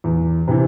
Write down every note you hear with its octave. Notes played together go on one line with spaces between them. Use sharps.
E2
C3 E3